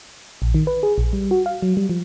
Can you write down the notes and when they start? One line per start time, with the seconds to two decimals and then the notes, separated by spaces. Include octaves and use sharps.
0.42 A#1
0.54 D#3
0.67 B4
0.83 G#4
0.98 A#1
1.13 G3
1.31 F#4
1.46 F5
1.62 F#3
1.77 G3
1.89 F3